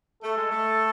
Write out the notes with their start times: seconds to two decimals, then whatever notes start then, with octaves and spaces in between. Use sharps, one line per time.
0.23 A3 A4
0.37 G#3
0.50 A3